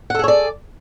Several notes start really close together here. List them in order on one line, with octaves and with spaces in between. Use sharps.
F#5 A4 G#4 C#5 D5